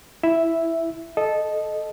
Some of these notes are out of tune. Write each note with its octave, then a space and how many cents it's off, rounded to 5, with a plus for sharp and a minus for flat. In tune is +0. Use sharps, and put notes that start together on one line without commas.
E4 +0 E5 +0
A4 -10 D#5 -10